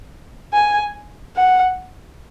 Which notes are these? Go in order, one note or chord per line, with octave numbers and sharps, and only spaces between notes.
G#5
F#5